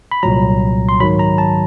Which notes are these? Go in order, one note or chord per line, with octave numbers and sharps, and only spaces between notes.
B5
C2 A#2 F#3 A#5
C6
G#2 D#3 F#3 B5
A#5
A5